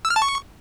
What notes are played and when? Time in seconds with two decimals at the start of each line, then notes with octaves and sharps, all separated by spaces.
0.05 E6
0.10 F6
0.16 A5
0.22 C#6